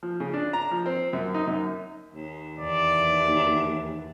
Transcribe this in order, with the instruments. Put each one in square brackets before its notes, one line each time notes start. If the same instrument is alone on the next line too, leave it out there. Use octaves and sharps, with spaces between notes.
[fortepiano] F3
C#3
D4
A#5
F3
C4
F#2
D#4
F#2
[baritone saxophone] D#2
[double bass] E2 E3 [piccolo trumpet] D5